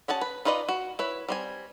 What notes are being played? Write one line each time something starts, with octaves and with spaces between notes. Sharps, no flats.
C#4 F#4 G#4 A5
B4
D#4 F4 B4 D5 D#5
F#4
E4 B4 C#5
G3 C4 G#5